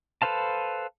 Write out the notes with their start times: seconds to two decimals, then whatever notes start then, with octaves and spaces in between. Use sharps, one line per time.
0.22 A4 B4 C5 F5 A5